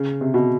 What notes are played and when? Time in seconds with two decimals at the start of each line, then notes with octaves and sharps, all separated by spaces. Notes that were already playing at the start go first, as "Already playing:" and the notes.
Already playing: C#3
0.21 C3
0.34 B2